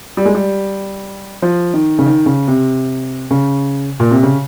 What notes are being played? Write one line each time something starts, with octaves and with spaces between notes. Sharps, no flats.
G3
G#3
G3
F3
D#3
C#3
D#3
C#3
C3
C#3
A#2
C3
C#3